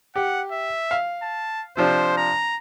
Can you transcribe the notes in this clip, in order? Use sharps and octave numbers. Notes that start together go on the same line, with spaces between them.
G4 F#5
E5
F5
A5
C3 F3 D4 C5
A#5